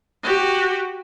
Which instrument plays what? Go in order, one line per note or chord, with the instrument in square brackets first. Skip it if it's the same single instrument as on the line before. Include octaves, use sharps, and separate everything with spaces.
[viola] F#4 G4